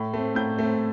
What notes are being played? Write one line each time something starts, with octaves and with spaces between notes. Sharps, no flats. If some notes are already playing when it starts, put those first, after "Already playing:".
Already playing: A2
A3 C4
A2 G6
A3 C4